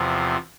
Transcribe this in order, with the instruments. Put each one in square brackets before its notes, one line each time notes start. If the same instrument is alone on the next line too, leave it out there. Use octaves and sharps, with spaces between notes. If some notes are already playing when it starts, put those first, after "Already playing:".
Already playing: [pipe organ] E2 C3 F3